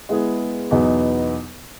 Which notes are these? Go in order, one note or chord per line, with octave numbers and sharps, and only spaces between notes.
G#3 B3 E4 G#4
E2 B2 F#3 B3 D#4